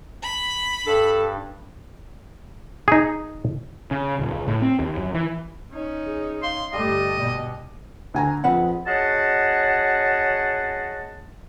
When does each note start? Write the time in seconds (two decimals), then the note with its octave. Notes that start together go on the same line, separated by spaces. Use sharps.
0.23 B5
0.87 G2 A4
2.88 D#4 G#4
3.91 C#3
4.19 D#1
4.32 C#2
4.48 A2
4.62 C4
4.79 D#2
4.98 F#2
5.14 E3
5.72 C#4 D#4
6.06 G#4
6.43 F5 C6
6.73 G1 G3 A3 D5 D#5 C6
7.19 B2
8.14 D2 G#5 A#5
8.44 F2 C4 G#4 B4 F#5
8.87 C#4 F#4 G#4 D#5 F#5 A5